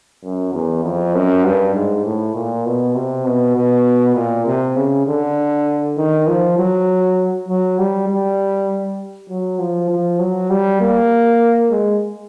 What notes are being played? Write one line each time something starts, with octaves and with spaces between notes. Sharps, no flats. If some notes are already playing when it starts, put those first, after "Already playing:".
F#2
E2
F2
F#2
G2
G#2
A2
A#2
B2
C3
B2
B2
A#2
C3
C#3
D3
D#3
F3
F#3
F#3
G3
G3
F#3
F3
F3
F#3
G3
A#3
G#3